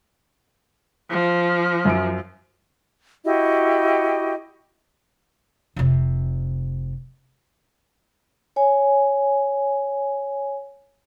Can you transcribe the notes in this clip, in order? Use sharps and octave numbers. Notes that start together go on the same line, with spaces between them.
F3
F#2 D7
E4 F#4 G4 D#5
F1 C3
C#5 G#5